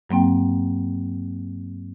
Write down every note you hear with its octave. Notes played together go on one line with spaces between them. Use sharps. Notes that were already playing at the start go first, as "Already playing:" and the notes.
G2 F#3 A#3 C4 G5